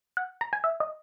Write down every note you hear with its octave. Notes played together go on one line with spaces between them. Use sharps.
F#5
A#5
G#5
E5
D#5